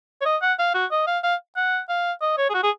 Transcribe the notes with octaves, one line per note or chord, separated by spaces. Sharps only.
C#5
D#5
F#5
F5
F#4
D#5
F5
F5
F#5
F5
D#5
C#5
G#4
F#4
G#4